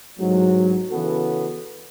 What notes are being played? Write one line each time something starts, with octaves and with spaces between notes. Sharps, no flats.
A1 G#2 F#3
C#3 E3 B3 F#4 A4